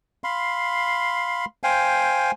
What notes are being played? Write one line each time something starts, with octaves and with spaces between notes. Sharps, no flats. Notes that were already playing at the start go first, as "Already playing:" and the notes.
F5 B5 C6
C5 F5 G5 G#5